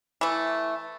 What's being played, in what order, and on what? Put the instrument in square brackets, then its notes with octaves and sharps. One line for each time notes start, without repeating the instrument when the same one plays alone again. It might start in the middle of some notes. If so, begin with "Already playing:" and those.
[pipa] E3 A3